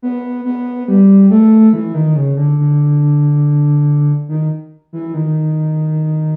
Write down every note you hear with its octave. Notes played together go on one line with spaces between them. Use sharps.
B3
B3
G3
A3
E3
D#3
C#3
D3
D3
D#3
E3
D#3